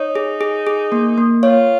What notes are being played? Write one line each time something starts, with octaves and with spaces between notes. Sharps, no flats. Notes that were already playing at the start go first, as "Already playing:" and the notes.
Already playing: D#4 C#5
G#4
G#4
G#4
A#3
A#3
F4 C#5